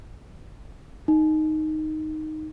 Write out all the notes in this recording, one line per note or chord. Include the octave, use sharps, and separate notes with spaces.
D#4